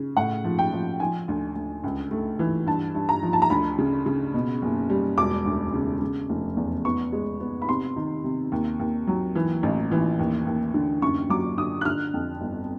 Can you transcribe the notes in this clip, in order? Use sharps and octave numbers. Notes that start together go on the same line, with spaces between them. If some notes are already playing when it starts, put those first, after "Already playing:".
Already playing: C#3
A2 F#5
F3
G5
F3
F3 G#5
D2
D2
C#2
A3
E3
G2 A5
G2
A#5
F3
A5
A#5
D2 B5
C#3
C#3
B2
F#1
G3
E1 D6
D2
C#3
C#3
F1
E2
B3 C#6
G#3
B3
B5
C3 C6
D#3
C3
D#2
D#2
F#3
E3
A1
E3
D#2
D#2
D3
F#2 C#6
F#3 D6
D3 D#6
F#6
D3 F6
F2
G1